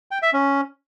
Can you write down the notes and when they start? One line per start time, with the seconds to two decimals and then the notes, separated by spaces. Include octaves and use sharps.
0.11 G5
0.22 E5
0.33 C#4